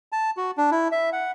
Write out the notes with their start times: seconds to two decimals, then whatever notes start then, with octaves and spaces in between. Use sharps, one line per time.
0.12 A5
0.37 F#4
0.58 D4
0.71 E4
0.92 E5
1.12 F#5